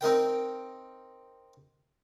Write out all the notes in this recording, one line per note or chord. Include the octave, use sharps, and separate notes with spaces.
C4 D#4 A#4 G5